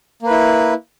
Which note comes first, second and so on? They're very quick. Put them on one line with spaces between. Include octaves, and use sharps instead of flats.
A#3 B4 E4